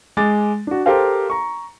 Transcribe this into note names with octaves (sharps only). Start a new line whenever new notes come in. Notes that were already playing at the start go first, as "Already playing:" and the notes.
G#3 D6 A6
D4 F#4
G4 A4 A#4 C5 F5 G5
A#5 C#6